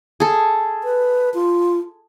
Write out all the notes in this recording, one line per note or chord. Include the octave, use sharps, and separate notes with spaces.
G#4 A4
B4
F4